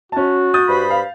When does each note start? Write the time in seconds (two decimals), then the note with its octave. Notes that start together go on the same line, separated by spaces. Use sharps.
0.12 C#4 F#4 A5
0.54 D#6 G6 A6
0.67 G2 C5 B5
0.90 F5